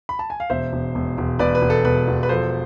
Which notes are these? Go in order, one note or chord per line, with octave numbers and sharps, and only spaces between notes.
B5
A5
G#5
F5
E1 C5 E5
E1
E1
E1
E1 B4 D5
B4
E1
A4
E1 B4
E1
B4
F3 A4 C5